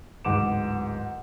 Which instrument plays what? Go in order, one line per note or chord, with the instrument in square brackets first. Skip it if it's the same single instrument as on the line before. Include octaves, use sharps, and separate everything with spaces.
[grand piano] D1 G#2 F#5 D6 E7